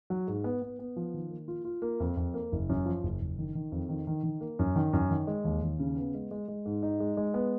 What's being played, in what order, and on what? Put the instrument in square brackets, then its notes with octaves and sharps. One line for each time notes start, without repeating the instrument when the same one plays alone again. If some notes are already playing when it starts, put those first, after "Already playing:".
[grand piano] F#3
G#2
B3
B3
B3
F3
D#3
A#3
F4
F4
A#3
F2
F2
A#3
F#1
F#2
F3
F#1
F#1
D#3
D#3
F2
D#3
D#3
D#3
A#3
F#2
D#3
F#2
D#3
G#3
D#2
D#2
C#3
B3
G#3
G#3
G#3
G#2
D#4
G#3
G#3
B3